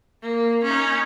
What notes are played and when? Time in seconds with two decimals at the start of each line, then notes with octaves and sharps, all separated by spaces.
0.22 A#3
0.63 C#4 D#4